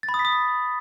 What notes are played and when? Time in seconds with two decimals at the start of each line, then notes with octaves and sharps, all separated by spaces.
0.03 A6
0.09 B5
0.14 D#6
0.19 B6
0.25 D#6